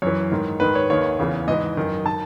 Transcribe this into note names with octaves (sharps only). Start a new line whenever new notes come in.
F#2 E3 C#5
G#2 D#3
G#2 D#3 B4
C#5
D#2 D#3 C#5
E2 C#3 E3
G#2 E3 D#5
F#2 D#3
D#3 A5